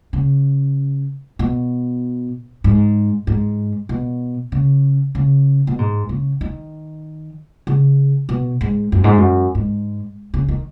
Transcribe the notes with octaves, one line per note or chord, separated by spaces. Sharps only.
C#3
B2
G#2
G#2
B2
C#3
C#3
B2
G#2
C#3
D#3
C#3
B2
G#2
F#2
G#2
F#2
G#2
C#3
D#3